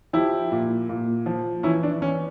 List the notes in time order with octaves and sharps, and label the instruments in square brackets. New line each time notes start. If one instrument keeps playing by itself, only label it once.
[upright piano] F3 E4 G4
A#2
A#2
F3
E3 C#4 E4
D4
E3 C#4